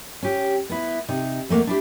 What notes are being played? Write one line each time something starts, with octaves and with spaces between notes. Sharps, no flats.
C#4 G4
B3 E4
C3 D#4
F2 A3 A#3 F#5
D4 E4 G4